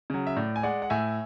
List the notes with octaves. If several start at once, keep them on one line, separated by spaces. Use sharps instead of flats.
C#3 F#3
E5
A2 D5
G#5
G#3 D5 F#5
F#5
A2 E5 G#5